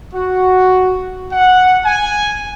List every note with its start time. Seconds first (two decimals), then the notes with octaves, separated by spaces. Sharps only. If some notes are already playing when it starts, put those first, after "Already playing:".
0.14 F#4
1.32 F#5
1.85 G#5